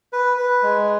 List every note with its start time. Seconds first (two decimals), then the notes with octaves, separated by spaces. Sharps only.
0.13 B4
0.37 B4
0.63 G#3